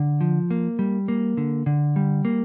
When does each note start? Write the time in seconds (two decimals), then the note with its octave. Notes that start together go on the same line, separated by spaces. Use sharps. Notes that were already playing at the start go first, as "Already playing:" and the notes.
Already playing: D3
0.21 F3
0.51 A#3
0.79 G3
1.08 A#3
1.37 D3
1.66 D3
1.96 G3
2.25 A#3